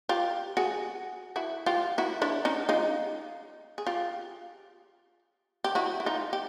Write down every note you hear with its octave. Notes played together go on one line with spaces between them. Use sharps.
F4 G4
F#4 G#4
E4 F#4
F4 G4
E4 F#4
D4 E4
C#4 D#4
D#4 F4
G#4
F4 G4
G4
E4 F#4
E4
D#4 F4
G4